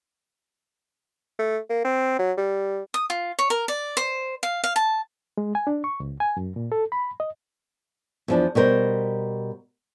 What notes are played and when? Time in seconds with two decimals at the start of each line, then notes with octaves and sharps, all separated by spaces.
1.39 A3
1.69 A#3
1.84 C4
2.19 F#3
2.37 G3
2.94 D#6
3.10 F4
3.39 C#5
3.50 A#4
3.68 D5
3.97 C5
4.43 F5
4.64 F5
4.76 A5
5.38 G#3
5.55 G#5
5.67 D4
5.84 C#6
6.00 C#2
6.20 G#5
6.37 F#2
6.56 A#2
6.72 A4
6.92 B5
7.20 D#5
8.28 E2 F3 D4
8.55 B2 G3 A#4 C5